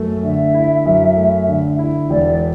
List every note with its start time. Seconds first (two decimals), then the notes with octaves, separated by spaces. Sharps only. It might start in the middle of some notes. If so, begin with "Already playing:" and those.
Already playing: F#2 A3
0.23 D3 E5
0.54 E4
0.86 F#2
1.17 A3
1.48 D3
1.79 E4
2.10 E1 D5